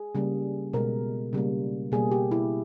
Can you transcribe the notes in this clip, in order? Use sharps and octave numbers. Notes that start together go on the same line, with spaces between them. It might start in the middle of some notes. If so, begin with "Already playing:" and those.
Already playing: G#4
C#3 G3 A#3
B2 G#3 A#4
C#3 G3 A#3
B2 G3 A#3 G#4
G4
E4